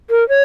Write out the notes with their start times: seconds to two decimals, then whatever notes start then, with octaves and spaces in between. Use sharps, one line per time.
0.10 A#4
0.29 C#5